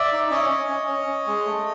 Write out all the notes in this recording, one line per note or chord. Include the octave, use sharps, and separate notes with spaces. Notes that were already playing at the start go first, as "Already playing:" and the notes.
Already playing: D5 E5
D#4
C#4 C#5 D#5
C#4
C#4
C#4
C#4
G#3
A3